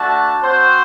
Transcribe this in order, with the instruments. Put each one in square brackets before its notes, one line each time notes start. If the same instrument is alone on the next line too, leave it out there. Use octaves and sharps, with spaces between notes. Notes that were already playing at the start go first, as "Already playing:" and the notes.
Already playing: [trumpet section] A3 D4 F#4 A5
C4 F#4 C5